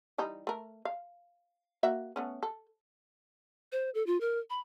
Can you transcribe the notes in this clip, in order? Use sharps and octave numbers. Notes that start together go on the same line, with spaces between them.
E3 G3 D#4
A3 A#4
F5
A#3 F#4 E5
A3 B3 C#4
A4
C5
A4
F4
A#4
B5